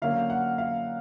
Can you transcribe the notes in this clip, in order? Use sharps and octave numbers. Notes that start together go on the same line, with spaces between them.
D3 F#3 A#3 C#4 F5
F#5
F5